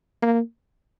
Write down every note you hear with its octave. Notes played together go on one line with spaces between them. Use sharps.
A#3